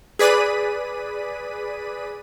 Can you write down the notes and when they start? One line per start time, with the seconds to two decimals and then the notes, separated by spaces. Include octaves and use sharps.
0.19 G#4 B4 D5 B6 D#7